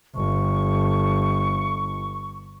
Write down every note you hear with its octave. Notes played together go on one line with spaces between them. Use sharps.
G1 C#6